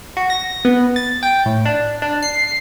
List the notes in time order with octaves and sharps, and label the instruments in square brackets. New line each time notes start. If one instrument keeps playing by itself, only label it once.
[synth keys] F#4
A#6
B3
A6
G5
A2
D4
D4
C7